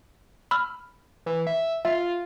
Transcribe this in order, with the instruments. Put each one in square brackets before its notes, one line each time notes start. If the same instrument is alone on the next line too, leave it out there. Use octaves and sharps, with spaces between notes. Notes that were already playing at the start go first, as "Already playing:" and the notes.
[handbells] B5 E6 F6
[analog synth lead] E3
E5
[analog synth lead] F4 [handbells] E5